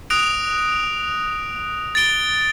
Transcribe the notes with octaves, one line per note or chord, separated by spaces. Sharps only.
D#6 F#6 A#6 D7 F7
A6 D7 G7